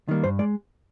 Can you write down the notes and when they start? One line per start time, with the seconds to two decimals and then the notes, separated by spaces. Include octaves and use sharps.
0.08 D#3 G3 A#3
0.24 G2 C5
0.39 G#3 D5